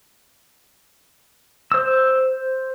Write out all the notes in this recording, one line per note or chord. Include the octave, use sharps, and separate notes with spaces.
C5 E6